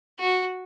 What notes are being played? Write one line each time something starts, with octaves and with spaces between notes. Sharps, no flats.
F#4